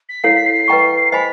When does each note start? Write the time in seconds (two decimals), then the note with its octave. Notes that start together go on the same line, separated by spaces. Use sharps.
0.09 B6
0.24 E4 A4 C#5 F5 C7
0.35 B6
0.46 C7
0.68 B4 D#5 G5 A#5 C#6
1.12 C5 D#5 G#5 B5 B6